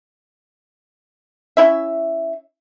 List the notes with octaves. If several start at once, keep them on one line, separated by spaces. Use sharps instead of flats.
C#4 E4 E5